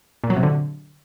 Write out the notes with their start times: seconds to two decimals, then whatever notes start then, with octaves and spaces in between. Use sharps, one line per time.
0.24 A#2
0.30 F#3
0.37 C3
0.43 D3